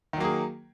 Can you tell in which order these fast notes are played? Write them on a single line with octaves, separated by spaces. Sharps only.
D#3 F#3 A#3 G#4